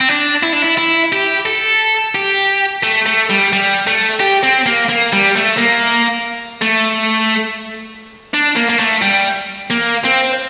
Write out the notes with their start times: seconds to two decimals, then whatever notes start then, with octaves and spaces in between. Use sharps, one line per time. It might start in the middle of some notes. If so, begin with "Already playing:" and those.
0.01 C4
0.09 D4
0.43 E4
0.53 D4
0.62 E4
0.78 E4
1.13 G4
1.46 A4
2.15 G4
2.83 A3
3.06 A3
3.30 G3
3.53 G3
3.87 A3
4.20 G4
4.43 C4
4.66 A#3
4.89 A#3
5.13 G3
5.36 A3
5.58 A#3
6.62 A3
8.34 D4
8.56 A#3
8.69 A#3
8.79 A3
9.02 G3
9.70 A#3
10.05 C4